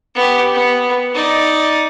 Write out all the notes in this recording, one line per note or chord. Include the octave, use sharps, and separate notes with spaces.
B3 G4
B3
D#4 D5